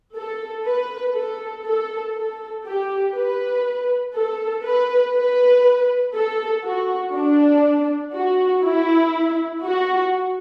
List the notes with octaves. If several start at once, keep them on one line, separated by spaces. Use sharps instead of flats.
A4
B4
A4
A4
A4
G4
B4
A4
B4
B4
A4
F#4
D4
F#4
E4
F#4